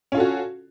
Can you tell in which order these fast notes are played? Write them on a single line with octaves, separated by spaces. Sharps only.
C#4 F4 A4 F#4